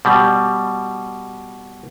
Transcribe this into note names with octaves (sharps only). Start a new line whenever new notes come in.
B2 G3